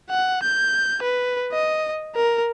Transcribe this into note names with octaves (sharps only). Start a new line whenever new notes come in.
F#5
G6
B4
D#5
A#4